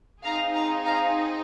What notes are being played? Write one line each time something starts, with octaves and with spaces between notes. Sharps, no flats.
C4 D#4 G#4 F5 A#5
F5 A#5
F5 A#5